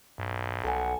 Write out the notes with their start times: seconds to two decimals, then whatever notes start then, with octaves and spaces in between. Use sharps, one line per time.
0.18 B1 G2
0.64 C2 A4 F#5 G#5